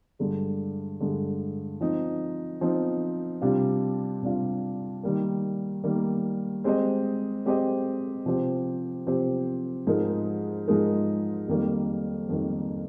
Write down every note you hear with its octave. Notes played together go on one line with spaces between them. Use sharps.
G2 D3 G#3
G2 D3 G#3
F3 C4 D#4
F3 C4 D#4
C3 G3 D4 F4
C3 G3 D4 F4
D#3 G3 A#3
D#3 G3 A#3
G#3 C4 G4 C5 D#5
G#3 C4 G4 C5 D#5
C3 F3 C4 G4 C5
C3 F3 C4 G4 C5
G#2 F3 G#3 D#4 A#4
G#2 F3 G#3 D#4 A#4
F2 D#3 G3 A#3
F2 D#3 G3 A#3